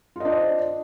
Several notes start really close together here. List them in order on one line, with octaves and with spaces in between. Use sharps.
F4 D#5 D4 D5 C5